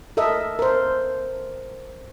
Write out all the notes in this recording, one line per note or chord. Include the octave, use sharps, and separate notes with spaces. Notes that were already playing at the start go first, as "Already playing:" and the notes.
A4 A#4 D#5 E5
A#4 C5